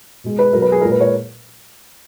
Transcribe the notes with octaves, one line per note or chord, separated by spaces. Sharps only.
B2 G#3
B4
B2 F#3 A#4
B4
G#4
A#2 G#3 A#4
B4
C#5